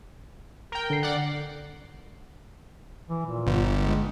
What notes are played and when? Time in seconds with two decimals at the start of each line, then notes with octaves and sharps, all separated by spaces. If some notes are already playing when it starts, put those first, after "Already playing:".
0.72 A#4 G5
0.90 D3 C7
1.03 D5 F#5
3.09 E3
3.25 A#2
3.47 G1
3.79 G#3